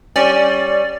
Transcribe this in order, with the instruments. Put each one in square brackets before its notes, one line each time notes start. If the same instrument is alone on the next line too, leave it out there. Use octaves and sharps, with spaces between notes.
[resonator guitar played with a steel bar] G3 C#4 [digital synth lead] D5